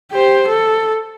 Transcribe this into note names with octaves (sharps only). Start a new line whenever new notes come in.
G4 C5
A4